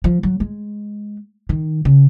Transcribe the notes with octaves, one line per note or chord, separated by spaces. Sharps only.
F3
F#3
G#3
D#3
C#3